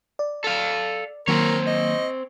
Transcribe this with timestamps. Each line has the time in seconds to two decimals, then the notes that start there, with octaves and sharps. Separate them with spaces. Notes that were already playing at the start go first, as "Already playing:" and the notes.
0.19 D5
0.44 A4 F5
1.28 D#3 F#3 A#3 C4 A#4 C#5
1.67 D#5